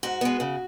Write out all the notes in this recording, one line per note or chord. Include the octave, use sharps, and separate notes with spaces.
G#2 F#4
G#3 B3
C#3